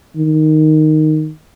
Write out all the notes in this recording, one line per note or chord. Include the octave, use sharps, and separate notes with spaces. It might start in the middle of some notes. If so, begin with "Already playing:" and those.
D#3